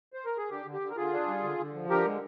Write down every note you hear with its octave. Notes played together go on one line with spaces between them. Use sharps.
C5
A#4
G#4
D3 G4
D3
G4
D3
A#4
D3 F4 G#4
D4
G3
D3
D3
F3
D3 G4 A#4
G#3